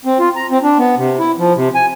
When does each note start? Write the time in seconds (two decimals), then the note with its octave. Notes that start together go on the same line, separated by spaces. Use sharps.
0.05 C4
0.19 F4
0.36 A#5
0.51 C4
0.63 D4
0.79 B3
0.97 C3
1.19 E4
1.38 F3
1.56 C3
1.75 G#5